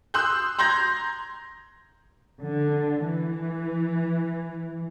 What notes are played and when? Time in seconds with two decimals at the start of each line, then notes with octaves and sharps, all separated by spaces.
0.14 C6 D#6 E6 F#6 G6
0.59 A#5 C6 G6 G#6 A#6
2.43 D3
3.04 E3